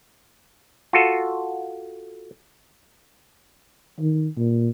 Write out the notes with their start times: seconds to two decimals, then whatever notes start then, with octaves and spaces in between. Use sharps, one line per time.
0.93 F4 F#4 A4
4.00 D#3
4.37 A#2